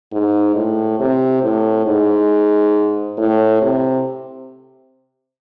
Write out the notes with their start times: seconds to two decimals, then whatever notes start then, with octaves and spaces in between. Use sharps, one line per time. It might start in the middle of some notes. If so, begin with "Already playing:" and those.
0.13 G#2
0.56 A2
0.99 C3
1.43 A2
1.87 G#2
3.18 A2
3.62 C3